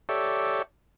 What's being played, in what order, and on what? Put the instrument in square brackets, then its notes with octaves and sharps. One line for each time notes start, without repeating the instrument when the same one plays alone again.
[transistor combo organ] G4 A4 C#5 D5 E5